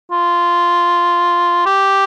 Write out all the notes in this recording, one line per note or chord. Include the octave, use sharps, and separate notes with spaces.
F4
G4